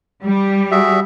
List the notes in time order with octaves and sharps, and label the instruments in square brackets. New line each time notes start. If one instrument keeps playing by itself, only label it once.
[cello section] G3
[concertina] F#4 G#4 E5